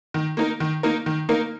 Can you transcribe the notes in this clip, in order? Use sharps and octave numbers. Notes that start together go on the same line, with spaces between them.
D#3
A#3 D#4 A#4
D#3
A#3 D#4 A#4
D#3
A#3 D#4 A#4